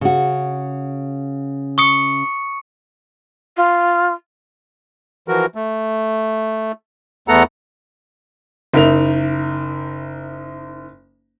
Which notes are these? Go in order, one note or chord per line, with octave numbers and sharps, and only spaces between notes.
C#3 F#4
C#6 D#6 C#7
F4
E3 F3 F#4 A#4
A3
E2 A3 B3 A4 F#5 A#5
F#1 D#4 A#4 E5 F7